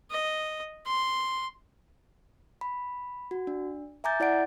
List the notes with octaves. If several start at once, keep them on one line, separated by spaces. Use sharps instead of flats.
D#5
C6
B5
F#4
D4
E5 G#5 A#5 D6 G6 A6
E4 D5 F#5 D7